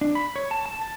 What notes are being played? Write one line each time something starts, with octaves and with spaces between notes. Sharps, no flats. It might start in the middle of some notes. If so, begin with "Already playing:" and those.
D4
B5
C#5
A5
A5
A5